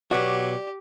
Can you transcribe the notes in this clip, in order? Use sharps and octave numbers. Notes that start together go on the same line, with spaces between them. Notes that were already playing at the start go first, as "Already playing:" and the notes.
B2 F#3 B3 F#4 G4 D5